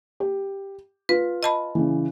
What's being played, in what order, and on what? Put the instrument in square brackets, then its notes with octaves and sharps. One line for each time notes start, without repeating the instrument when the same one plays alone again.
[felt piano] G4
[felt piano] F4 [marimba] B4
[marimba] D#5 A5 B5
[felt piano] C#3 E3